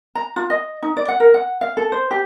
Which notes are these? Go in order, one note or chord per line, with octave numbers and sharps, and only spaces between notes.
A#5
F4
D#5
D#4
D5
F#5
A#4
F#5
F5
A4
C5
G4